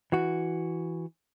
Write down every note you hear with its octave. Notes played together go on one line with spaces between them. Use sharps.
E3 F#4